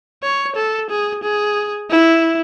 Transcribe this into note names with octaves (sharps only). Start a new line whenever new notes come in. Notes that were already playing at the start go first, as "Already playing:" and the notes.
C#5
A4
G#4
G#4
E4